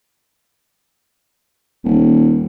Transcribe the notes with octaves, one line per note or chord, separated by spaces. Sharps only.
D#1